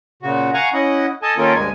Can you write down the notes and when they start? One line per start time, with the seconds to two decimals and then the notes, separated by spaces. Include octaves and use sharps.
0.23 A#2 C#3 F#4
0.54 F5 F#5 G#5 A#5 C#6
0.73 C#4 E4 D#5 F#5
1.22 A4 D#5 G#5 A5
1.37 D#3 A#3 C#4 F4 A4 A#4
1.54 D2 G2 G#3 G#5